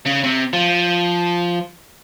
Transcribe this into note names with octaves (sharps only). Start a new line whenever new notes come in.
C#3
C3
F3